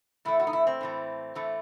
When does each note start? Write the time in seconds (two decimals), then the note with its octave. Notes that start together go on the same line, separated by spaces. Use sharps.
0.25 A2 E3 A3 E4
0.40 F#4
0.47 D#4
0.53 E4
0.67 C4
0.81 A2 E3 A3
1.35 A2 E3 A3